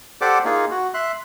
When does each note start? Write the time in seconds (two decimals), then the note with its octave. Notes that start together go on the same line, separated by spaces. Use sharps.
0.21 G4 A4 C5 D5 F#5 D6
0.45 A#3 D#4 F4 G#4
0.71 F#4
0.94 E5 C6 F#6